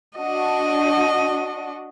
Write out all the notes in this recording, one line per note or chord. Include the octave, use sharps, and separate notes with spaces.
D4 F#4 D#5